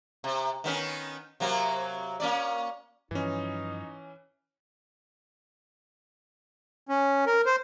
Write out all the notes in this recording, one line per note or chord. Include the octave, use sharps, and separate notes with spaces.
C3
D#3 B3 C#4
C3 F#3 A#3
A#3 C#4 D5
G2 E3 F3 C#4 D#4
C#4
A#4
C5